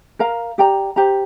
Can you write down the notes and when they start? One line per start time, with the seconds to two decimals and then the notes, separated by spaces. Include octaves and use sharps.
0.19 A#4 F5 A#5
0.58 G4 D5 G5 A#5
0.96 G4 C5 A#5